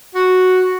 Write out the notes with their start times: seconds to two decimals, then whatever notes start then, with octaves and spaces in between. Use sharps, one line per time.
0.15 F#4